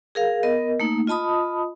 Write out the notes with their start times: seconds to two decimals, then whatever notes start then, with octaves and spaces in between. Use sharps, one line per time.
0.15 G#4 A#4 F5
0.43 B3 A#4 D#5
0.80 A3 A#3 D#4
1.07 F4 D#5 A5 B5 D#6